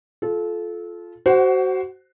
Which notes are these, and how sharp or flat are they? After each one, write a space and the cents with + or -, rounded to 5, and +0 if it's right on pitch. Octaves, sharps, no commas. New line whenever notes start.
F4 +0 A4 -25
F#4 +25 C5 +0 F#5 +0